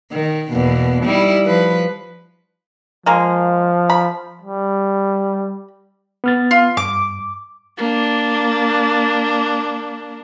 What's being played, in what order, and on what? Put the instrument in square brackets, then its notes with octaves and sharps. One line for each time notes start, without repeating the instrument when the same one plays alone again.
[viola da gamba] D#3
E2 B2 A#3
G3 D#4 E4
F3 B4
[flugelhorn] F3 [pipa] G#3 A#3
[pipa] B5
[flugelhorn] G3
[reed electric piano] B3 F6 A6
[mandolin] F4
[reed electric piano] G2 [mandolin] D6
[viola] A#3 D4